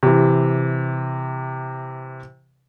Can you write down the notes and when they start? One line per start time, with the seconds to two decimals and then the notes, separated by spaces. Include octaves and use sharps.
0.03 C3 E3